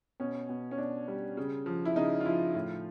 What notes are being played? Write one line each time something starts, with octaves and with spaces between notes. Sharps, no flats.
B2 C#4
B2
C#4
B2 D4
G3
C#3
F3
E4
C#3 D#4
F4
F3 E4
A2 F4